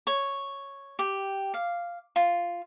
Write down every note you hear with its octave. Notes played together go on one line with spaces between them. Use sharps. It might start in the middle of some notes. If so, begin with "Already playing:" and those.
C#5
G4
F5
F4